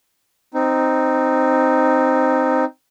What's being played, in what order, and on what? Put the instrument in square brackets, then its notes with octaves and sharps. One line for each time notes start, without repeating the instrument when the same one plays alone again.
[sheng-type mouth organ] C4 D#4